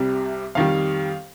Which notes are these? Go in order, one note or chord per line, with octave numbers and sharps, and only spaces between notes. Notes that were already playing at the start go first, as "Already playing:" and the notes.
Already playing: C2 C3 G3
F2 D#3 G3 F5